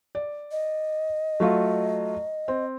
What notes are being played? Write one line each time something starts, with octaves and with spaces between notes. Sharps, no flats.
D5
D#5
F#3 A3 F4
C4